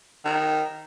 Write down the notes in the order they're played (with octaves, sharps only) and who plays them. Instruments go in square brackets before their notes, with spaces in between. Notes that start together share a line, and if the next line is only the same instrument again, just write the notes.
[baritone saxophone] D#3